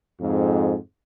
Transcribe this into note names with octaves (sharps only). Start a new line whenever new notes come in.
F2 G#2